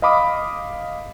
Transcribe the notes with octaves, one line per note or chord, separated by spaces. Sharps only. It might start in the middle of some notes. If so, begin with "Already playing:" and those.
D#5 F5 B5 D6 D#6